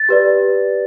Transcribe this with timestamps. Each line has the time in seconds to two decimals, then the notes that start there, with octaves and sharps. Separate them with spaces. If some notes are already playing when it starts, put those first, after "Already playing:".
Already playing: A6
0.09 G4 B4 D5